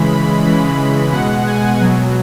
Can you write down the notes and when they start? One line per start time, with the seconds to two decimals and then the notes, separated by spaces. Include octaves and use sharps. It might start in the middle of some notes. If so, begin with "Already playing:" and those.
Already playing: C#3 E3 G#3 B5
0.11 B5
0.44 C#3 E3 G#3 B5
1.12 B2 G#3 F#5
1.47 G#5
1.81 B2 F#3